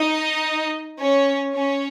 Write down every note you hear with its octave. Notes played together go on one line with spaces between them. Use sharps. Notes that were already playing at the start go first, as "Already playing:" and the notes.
Already playing: D#4 D#5
C#4 C#5
C#4 C#5